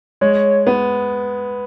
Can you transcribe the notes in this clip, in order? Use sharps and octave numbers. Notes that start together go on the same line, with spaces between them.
G#3 C#5
B3